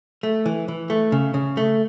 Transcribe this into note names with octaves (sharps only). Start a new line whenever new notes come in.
A3
E3
E3
A3
C#3
C#3
A3